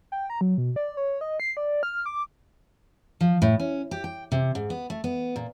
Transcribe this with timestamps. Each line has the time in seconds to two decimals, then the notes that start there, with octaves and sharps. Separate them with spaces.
0.12 G5
0.30 A#5
0.41 F#3
0.58 B2
0.76 D5
0.97 C#5
1.21 D#5
1.40 C7
1.57 D5
1.83 F6
2.06 D6
3.21 F3
3.42 A2
3.60 C#4
3.91 G4
4.04 G5
4.32 C3
4.55 G#2
4.70 B3
4.90 A3
5.04 B3
5.36 A#2